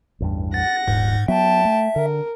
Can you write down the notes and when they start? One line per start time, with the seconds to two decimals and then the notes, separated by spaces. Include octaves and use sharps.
0.20 A1 E2 G2
0.54 F#5 A6 A#6
0.88 D#1 G#2
1.28 F#3 B3 E5 G5 A5
1.65 A3
1.96 D3 A#4